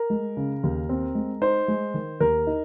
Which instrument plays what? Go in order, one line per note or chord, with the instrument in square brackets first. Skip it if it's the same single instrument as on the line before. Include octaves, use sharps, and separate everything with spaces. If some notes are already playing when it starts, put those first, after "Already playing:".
Already playing: [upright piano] A#4
[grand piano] G#3
C#3
D#2
C4
G#3
[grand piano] D#4 [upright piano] C5
[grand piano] G#3
D#3
[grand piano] D#2 [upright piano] A#4
[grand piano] D#4